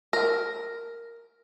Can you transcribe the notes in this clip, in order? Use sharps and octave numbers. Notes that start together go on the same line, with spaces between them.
A#4